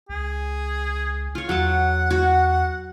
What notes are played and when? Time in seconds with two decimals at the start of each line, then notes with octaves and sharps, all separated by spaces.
0.09 C#2 G#4
1.35 F4 C#5
1.49 E2 F#3 A4 F#5 A5
2.10 F#4